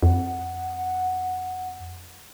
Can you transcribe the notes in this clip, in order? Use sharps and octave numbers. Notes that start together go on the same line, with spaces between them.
F2 F#5